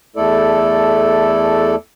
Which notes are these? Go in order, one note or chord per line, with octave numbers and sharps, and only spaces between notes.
E2 A3 E4 A4 D5